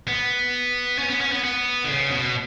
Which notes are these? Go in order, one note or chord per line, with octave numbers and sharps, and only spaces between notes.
B3
C#4
B3
C#4
B3
B3
D3
C#3
B2